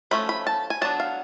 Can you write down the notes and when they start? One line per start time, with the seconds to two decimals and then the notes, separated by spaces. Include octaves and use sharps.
0.11 F3 A3 C#4 B5
0.29 B5
0.47 A5
0.70 G#5
0.81 F#3 B3 D4 A5
1.00 F5